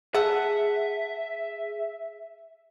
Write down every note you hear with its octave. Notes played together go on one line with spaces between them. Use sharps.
G#4 A4 E5 F#5